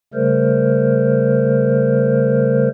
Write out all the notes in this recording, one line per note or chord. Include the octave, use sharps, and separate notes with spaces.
C#3 G3 A3 A#4 C5